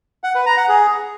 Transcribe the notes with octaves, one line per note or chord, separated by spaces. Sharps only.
F#5
B4
A#5
F#5
G#4